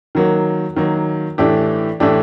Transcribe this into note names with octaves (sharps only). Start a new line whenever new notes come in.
D#3 F#3 A#3
D#3 F#3 A#3
A2 E3 A3 D4 G4
A2 E3 A3 D4 G4